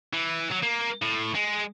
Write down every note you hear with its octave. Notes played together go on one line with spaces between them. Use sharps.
E3
F#3
A#3
A2
G#3